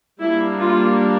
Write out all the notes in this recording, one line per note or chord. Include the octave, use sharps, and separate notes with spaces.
G3 A#3 D4 E4
F4